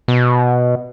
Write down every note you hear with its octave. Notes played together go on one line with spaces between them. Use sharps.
B2